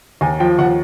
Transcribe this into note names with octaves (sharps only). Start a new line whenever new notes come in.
D#2 G#5
F3 G5
D#2 F#5